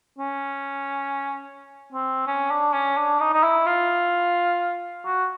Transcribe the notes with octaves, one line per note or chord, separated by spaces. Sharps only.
C#4
C4
C#4
D4
C#4
D4
D#4
D#4
E4
F4
F#4